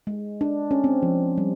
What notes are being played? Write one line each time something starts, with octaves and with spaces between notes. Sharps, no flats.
G#3
D4
C#4
C4
F3
G3